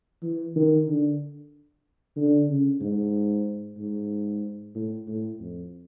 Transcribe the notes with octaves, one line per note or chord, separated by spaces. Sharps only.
E3
D#3
D3
D3
C#3
G#2
G#2
A2
A2
F2